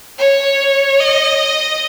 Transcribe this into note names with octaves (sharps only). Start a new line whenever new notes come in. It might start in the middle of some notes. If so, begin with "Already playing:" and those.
C#5
D#5